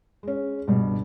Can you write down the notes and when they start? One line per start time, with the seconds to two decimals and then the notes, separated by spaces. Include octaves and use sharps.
0.23 G#3 C#4
0.68 C#2 G2 B2